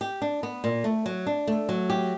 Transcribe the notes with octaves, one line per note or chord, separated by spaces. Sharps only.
G4
D4
B3
A#2
A3
F#3
D4
A3
F#3
G4